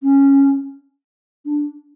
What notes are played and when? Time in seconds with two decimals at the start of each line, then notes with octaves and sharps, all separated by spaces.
0.02 C#4
1.45 D4